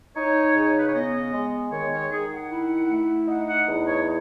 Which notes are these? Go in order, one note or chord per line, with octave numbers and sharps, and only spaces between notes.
D#4 C#5
C#3
B4
C#5
B3 D#5
G#3
D#3 C#5
C#5
D#3 G#4
F#5
E4
A3
D#4 F#5
F#5
E2
C#5